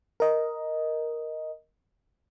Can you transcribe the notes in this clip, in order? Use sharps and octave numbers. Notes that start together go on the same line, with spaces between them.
A#4 D#5